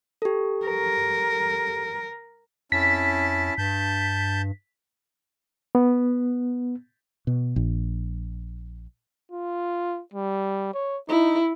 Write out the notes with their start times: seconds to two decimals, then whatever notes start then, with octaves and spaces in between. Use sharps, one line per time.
0.22 G4 A4
0.66 A#4
2.72 F2 C#4 E4 A5 B6
3.58 G2 A5 G6
5.75 B3
7.27 B2
7.56 A#1
9.31 F4
10.14 G3
10.74 C#5
11.09 D#4 E4